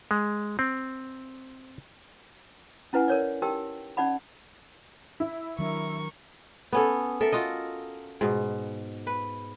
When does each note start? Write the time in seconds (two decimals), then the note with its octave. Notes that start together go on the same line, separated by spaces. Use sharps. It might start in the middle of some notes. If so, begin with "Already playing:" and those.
0.11 G#3
0.59 C4
2.93 C#4 E4 B4 F#5 G#5
3.08 A#4 C#5 D5
3.42 D#4 G4 A#4 G5 E6
3.97 C#4 D#4 D5 F#5 B5
5.20 E4
5.59 D#3 F#3 D4 A#4 C#6
6.72 B3 C#4 A4
7.21 A4 A#4 E5
7.32 F4 F#4 D#5
8.21 G#2 B2
9.07 B4